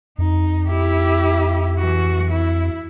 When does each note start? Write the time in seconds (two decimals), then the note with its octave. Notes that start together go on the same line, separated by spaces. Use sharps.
0.18 F2 D#4
0.68 E4 G4
1.79 E3 F#4
2.31 E4